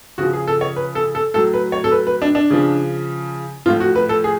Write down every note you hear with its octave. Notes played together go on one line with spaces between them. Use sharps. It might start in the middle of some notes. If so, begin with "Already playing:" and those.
C#3 F3 F#4
G#4
A4
C#5
B4
A4
A4
A2 F#3 A4
B4
C#5
A4
B4
B4
D4
D4
C#3 F3
A2 F3 F4
F#4
B4
A4
G#4